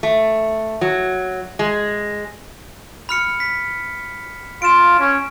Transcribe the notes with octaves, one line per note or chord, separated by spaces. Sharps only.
A3
F#3
G#3
B5 F6 C#7
B6
F4 D7 E7
C#4